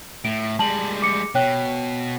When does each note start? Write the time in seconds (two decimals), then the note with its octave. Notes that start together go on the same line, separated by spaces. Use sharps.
0.25 A2 D7
0.59 G3 G#3 A5 F#7
1.02 D6 C#7
1.35 B2 C#5 G5 F#6